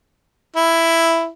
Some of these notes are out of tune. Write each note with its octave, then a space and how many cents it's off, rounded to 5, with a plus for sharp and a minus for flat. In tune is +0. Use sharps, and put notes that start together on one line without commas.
E4 +5